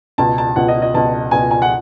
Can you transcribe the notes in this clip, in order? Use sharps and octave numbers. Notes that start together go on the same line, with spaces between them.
C#2 B2 A5
A5
C#2 B2 F#5
D#5
D#5
C#2 B2 A5
C#2 B2 G#5
G#5
F#5